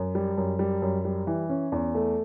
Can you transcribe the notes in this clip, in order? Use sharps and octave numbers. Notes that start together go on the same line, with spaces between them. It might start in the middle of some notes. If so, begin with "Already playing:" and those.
Already playing: F#2
G3
F#2
G3
F#2
G3
E3
C#4
E2
A3